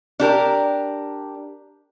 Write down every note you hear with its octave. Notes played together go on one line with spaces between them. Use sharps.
D4 G4 A#4